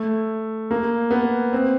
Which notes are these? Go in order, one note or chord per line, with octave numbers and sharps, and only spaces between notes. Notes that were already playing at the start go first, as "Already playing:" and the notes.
Already playing: A3
A#3
B3
C4